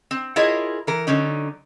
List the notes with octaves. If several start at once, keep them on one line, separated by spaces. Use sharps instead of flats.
C4
E4 F4 G#4 A#4 C#5 D#5
E3 A#4
D3 F#3 C#4 D#4